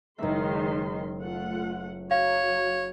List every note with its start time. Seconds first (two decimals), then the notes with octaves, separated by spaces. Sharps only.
0.18 F#1 D#3 G#3 E5 C6
1.21 A3 F4 F#5
2.11 F#3 C#5 F5